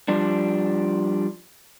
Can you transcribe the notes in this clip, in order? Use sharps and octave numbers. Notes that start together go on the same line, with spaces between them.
F3 G3 D4